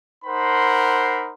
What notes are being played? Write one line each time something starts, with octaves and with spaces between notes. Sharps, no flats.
D#4 A#4 C5 F#5 B5 C6